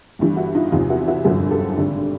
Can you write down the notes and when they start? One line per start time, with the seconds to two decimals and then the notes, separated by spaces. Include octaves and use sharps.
0.19 G1 G2 E3
0.37 E4 F#4
0.55 D#4 F4
0.72 E2 C3 F3 D#4 F4
0.90 E4 F#4
1.07 E4 F#4
1.24 G1 F#2 D3 F3 F#4 G#4
1.51 G4 A4
1.77 G#1 G2 D3